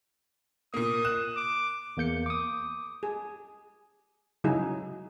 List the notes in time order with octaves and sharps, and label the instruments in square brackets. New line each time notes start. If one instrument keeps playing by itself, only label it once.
[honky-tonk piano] A#2 A#3 [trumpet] D#6
[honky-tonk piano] F#6 E7
[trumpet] D6
[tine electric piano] E2 A#3 G6 C#7
D6 D#6
[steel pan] G#4
C#3 F#3 D#4 E4 G#4